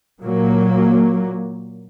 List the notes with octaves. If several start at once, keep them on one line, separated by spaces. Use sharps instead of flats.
A#2 F#3 A#3